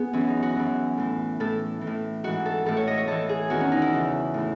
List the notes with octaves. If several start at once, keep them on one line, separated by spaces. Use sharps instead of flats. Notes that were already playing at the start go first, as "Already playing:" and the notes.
Already playing: B3 G#4 B4
F#2 E3 C#4
D#4
F#4
F#2 E3
A2 E3
A2 E3 A4
E3
A2
G#2 E3 F#4
A4
A2 E3 A4
C#5
D#5
C#5
A2 E3 A4
G#4
E2 D#3 F#4
C#4
D#4
E4
E2 C#3 E3
A2 E3